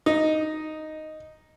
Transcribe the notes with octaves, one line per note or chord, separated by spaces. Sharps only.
D#4